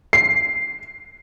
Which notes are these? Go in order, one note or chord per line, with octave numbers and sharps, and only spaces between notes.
C7